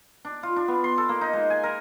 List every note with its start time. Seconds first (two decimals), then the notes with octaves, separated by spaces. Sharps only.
0.25 D4
0.43 F4
0.56 D4
0.68 B3
0.84 C6
0.98 A4
1.09 A#3
1.21 D#4
1.33 G#3
1.50 G#5
1.64 A#4